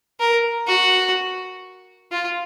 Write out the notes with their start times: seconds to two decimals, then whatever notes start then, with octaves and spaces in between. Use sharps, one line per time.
0.20 A#4
0.67 F#4
2.12 F4